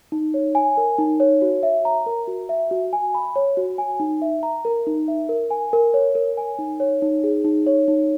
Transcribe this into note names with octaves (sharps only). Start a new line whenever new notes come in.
D#4
C#5
G#5
A#4
D#4
C#5
F#4
E5
A#5
A#4
F#4
E5
F#4
G#5
B5
C#5
F#4
G#5
D#4
E5
A#5
A#4
D#4
E5
A#4
G#5
A#4
C#5
A#4
G#5
D#4
C#5
D#4
G#4
D#4
C#5
D#4